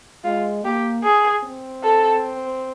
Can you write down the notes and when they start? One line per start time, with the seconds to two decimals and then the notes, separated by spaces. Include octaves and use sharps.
0.24 G#3 F4
0.64 A#3 G4
1.04 G#4
1.44 C4
1.84 A4